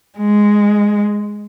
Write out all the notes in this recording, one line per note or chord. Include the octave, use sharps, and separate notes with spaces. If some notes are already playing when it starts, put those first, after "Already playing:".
G#3